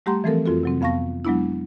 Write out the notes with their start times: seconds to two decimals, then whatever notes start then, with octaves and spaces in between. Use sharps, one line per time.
0.06 G3 A3 G4 F#5 A#5 C6
0.24 E3 F3 A3 C4 A4 A#4
0.46 F2 C4 F4 F#4 A4
0.63 C3 F#3 C4
0.81 F2 B3 F5 A5 C#6 A#6
1.25 F#3 G#3 B3 D4 E4